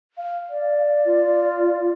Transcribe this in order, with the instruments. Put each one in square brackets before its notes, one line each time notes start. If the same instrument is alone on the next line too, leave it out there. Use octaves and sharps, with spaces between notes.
[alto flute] F5
[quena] D5
[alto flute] F4